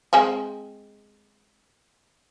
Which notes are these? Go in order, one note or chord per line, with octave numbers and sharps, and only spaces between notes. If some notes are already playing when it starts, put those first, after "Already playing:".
G#3 C4 G#5